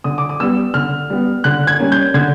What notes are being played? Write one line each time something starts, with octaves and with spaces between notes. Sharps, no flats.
D3 D#6
D6
D#6
G3 B3 E6
D3 F6
G3 B3
D3 F#6
G#6
G3 A#3 C#4
G6
D3 G#6